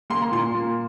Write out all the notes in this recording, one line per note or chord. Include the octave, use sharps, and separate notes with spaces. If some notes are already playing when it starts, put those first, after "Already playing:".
A#3 C6
A#5
A#2 C6
A#3